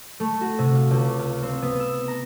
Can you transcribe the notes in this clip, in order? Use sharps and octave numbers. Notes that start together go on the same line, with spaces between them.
A3
F#4
C3
F5
C#2
F5
C4
B3
E6
A#5